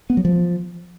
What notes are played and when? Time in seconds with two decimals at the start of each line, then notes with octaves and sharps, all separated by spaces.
0.10 B3
0.17 F#3
0.25 F3